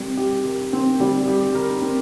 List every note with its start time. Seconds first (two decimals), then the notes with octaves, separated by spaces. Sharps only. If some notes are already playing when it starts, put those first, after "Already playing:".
Already playing: G3 C4 A#4
0.17 G4
0.45 A#4
0.73 C4
1.00 G3
1.28 G4
1.55 A#4
1.82 C4